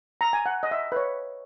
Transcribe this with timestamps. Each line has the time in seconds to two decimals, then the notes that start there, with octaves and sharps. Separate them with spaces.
0.21 A#5
0.33 G#5
0.46 F#5
0.63 D#5
0.71 E5
0.92 B4
0.96 C#5